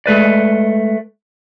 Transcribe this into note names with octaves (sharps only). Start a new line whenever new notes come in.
G#3 A3 B4 D5